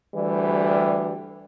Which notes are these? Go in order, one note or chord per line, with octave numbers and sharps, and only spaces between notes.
D2 E3 G3